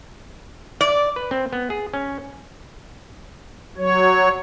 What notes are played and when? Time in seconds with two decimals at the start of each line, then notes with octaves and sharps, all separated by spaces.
0.81 D5
1.16 B4
1.31 C4
1.53 B3
1.70 G#4
1.94 C#4
3.77 F#3 C#5